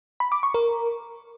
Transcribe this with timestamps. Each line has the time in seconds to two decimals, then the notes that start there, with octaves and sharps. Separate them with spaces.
0.20 B5
0.32 D6
0.43 C#6
0.54 A#4